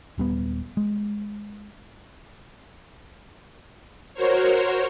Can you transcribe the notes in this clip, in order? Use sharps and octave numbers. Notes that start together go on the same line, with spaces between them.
D#1 G3 B3
G#3
F#4 A#4 C5 C#5